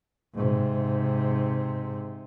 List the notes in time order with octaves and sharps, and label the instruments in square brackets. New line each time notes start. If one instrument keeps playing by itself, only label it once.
[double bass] G#2 C3